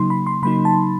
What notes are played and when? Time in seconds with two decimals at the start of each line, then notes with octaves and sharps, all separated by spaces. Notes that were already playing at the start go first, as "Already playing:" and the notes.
Already playing: C#3 F#3 A#3 D#4 C6
0.10 B5
0.27 C6
0.42 C#3 F#3 A#3 D#4 B5
0.65 A5